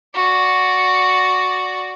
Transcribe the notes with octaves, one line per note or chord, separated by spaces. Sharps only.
F#4 D5